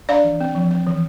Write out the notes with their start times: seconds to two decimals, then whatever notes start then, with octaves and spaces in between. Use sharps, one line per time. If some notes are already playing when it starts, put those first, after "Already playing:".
0.09 D4 D5 F5
0.24 E3
0.40 C4
0.55 F3
0.71 C4
0.87 E3